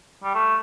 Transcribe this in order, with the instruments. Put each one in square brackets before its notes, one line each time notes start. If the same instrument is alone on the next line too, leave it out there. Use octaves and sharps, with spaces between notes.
[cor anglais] G3
A3